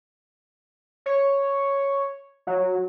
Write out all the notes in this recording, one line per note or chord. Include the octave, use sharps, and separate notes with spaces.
C#5
F#3